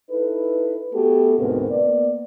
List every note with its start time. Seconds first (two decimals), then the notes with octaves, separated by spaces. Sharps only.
0.10 D#4 E4 A4 B4
0.93 A3 B3 F#4 G4 A4
1.39 D2 G#2 B2 B3 C4 A#4
1.70 A#3 B3 D5